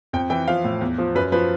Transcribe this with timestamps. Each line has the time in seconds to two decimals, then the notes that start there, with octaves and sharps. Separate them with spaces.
0.13 F2 G5
0.30 E3 G5
0.48 F3 F5
0.64 A2
0.81 E2
0.98 F3
1.15 F#2 B4
1.32 F3 B4